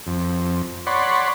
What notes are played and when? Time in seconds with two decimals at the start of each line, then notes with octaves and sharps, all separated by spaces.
0.07 F2
0.87 C#5 D5 F#5 B5 C6